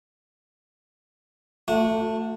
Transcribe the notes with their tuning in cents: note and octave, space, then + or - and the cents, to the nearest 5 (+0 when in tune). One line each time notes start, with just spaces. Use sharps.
A3 +15 F#4 -30